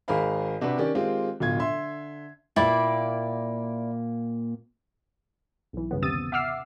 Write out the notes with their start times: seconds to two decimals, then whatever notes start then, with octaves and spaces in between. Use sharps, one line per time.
0.08 G#1 G#4 A#4 C5 F5 B5
0.61 C3 D4 F#4 G4 B4
0.78 D#3 C#4 G4 D5
0.95 D#3 G#3 C4 F4 G4
1.40 D1 B2 F4 G#6
1.59 D3 E5 C6
2.56 A#2 A#3 E4 D5 G5 B5
5.73 B1 E3
5.91 G2 C#3 B3
6.02 D#2 C3 D#6 E6 A6 D#7
6.32 E5 F#5 D6 E6 F6 C7